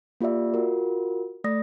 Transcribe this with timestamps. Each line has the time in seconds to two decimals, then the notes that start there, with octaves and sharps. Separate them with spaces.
0.21 A#3 F4 G4 D5 E5
0.54 F4 F#4 A#4
1.44 A3 D5 D#6 A#6